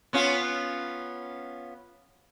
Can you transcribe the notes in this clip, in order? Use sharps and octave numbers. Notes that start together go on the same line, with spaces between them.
B3 C#4 F4